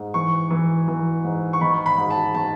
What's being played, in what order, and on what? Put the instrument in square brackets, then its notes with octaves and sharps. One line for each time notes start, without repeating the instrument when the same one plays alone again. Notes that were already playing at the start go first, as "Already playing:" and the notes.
Already playing: [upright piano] G#2
E3 C#6
E3
E3
G#2
C#6
D#3 B5
B5
G#2
A5
D#3 A5